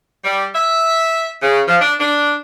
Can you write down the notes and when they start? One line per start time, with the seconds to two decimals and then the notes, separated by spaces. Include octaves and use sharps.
0.25 G3
0.55 E5
1.43 C#3
1.68 F3
1.82 D4
2.00 D4